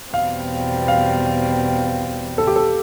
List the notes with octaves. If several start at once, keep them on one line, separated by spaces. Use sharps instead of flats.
E2 B2 G3 C4 F5
F5
A4
G4
A4